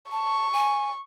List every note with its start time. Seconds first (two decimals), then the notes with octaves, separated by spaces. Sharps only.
0.11 A5 C#6
0.53 G#5